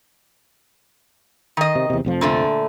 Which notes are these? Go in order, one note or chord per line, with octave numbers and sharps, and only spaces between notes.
D#3 D#5
C3
E2 C3
F1 F2 F3
A#2 D3 A3